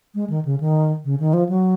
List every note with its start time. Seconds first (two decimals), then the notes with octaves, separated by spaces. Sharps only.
0.15 G#3
0.30 D#3
0.45 C#3
0.60 D#3
1.05 C#3
1.20 D#3
1.33 F3
1.49 F#3